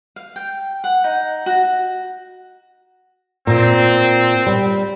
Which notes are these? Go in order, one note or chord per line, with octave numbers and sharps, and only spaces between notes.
F5
G5
F#5
D#4
F#4
A#2 C4
G3